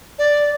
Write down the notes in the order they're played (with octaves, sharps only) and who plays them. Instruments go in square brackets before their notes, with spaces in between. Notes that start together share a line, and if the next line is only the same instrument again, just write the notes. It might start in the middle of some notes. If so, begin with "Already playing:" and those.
[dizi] D5